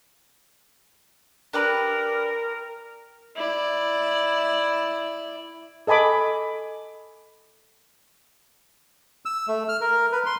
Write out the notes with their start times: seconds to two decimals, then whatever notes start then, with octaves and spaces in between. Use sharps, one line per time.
1.53 D4 G4 A#4 B4
3.35 E4 D5
5.87 A4 D#5 G#5 B5 D6
9.25 E6
9.48 A3
9.69 F6
9.81 A#4
10.12 B4
10.26 C6